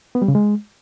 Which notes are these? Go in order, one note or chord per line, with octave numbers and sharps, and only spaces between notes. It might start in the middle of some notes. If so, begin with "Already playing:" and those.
B3
G3
C#3
G#3